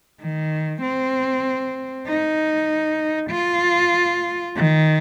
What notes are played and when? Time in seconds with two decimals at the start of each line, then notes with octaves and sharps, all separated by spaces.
0.21 D#3
0.82 C4
2.07 D#4
3.30 F4
4.55 D#3